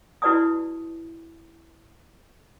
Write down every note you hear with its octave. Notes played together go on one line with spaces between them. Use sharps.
E4 F#4 B4 D5 A5 D#6